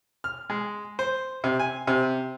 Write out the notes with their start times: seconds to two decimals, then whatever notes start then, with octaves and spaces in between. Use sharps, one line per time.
0.24 F6
0.50 G#3
0.99 C5
1.44 C3
1.59 G#5
1.87 C3